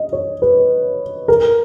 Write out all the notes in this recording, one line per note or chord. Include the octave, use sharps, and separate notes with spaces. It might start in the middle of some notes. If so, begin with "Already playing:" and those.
Already playing: D#5
C#5
B4
A#4